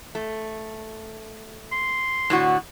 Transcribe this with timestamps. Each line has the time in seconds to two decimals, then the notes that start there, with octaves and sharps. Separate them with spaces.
0.15 A3
1.72 C6
2.30 A2 D3 F#4